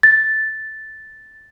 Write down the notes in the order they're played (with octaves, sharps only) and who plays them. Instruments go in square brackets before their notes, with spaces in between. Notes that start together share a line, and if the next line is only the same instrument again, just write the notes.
[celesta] A6